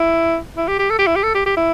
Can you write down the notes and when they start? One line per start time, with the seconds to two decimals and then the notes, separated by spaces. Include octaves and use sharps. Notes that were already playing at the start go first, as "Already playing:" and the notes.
Already playing: E4
0.57 E4
0.68 G4
0.79 G4
0.90 A4
0.99 G4
1.07 E4
1.16 G4
1.24 A4
1.35 G4
1.46 G4
1.57 E4